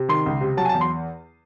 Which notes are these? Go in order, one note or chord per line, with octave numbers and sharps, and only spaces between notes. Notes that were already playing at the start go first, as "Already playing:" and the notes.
Already playing: C3
D#3 C6
C#2
C3
F#3 A5
G#5
A5
E2
C6